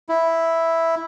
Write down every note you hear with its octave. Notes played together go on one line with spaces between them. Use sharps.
E4